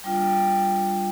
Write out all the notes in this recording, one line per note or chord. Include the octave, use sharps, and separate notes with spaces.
G3 D4 F4 G5